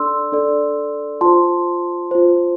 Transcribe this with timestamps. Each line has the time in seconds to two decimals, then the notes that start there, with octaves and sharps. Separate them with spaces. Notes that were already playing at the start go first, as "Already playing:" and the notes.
Already playing: D4 A4 D5 C6 E6
0.32 D4 A4 D5
1.21 F4 C5 A5 C6
2.11 F4 C5